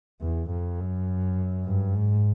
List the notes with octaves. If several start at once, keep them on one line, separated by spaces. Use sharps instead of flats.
E2
F2
F#2
G2
G#2